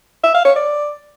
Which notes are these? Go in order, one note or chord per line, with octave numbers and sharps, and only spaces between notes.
E5
F5
C#5
D5